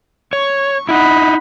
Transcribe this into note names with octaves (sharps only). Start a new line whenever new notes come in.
C#5 C#6
D#4 E4 F#5 B5